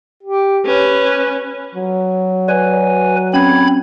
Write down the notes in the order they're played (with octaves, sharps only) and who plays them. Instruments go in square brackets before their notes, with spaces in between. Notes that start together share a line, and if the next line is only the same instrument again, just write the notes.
[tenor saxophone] G4
[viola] C#4 [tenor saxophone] B4
[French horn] F#3
[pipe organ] B4 G#5 [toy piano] D5
[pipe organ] C4 B5 G#6 [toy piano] C#4